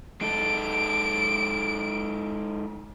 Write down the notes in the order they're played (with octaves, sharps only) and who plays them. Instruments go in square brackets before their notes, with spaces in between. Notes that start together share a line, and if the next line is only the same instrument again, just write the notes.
[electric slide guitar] G#3 D#4 A4 [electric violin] D7